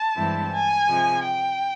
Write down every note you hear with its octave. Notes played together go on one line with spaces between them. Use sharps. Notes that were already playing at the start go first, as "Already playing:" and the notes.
Already playing: A5
G2 E3 G#3 C4 E4
G#5
C3 F3 G#3
G5